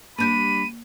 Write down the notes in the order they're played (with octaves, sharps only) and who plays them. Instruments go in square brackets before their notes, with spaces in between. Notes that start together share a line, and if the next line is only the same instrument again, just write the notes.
[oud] G3 D4 B4 [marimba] A#3 G6 [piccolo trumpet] B5 [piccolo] D#7